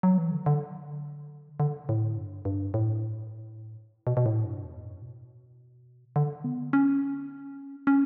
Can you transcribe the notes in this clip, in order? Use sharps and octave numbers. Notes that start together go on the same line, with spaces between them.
F#3
E3
D3
D3
D3
A2
G2
G2
A2
B2
B2
A2
G2
E2
F#2
B2
D3
B3
C#4
C#4